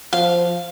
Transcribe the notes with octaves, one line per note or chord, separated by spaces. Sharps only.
F3 F5